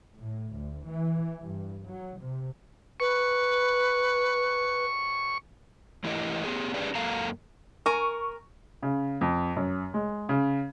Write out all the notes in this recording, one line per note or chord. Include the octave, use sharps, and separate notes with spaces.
A2
D2
E3
G2
F#3
C3
B4 C#6
E3 A3 E4 G4 A#4 D#5
B3 G4 G#4
C#4 D4 G4 G#4 B4 D5
F#2 A#3 A4 F5 A#5
A#4 G#5 C#6
C#3
F2
F#2
G#3
C#3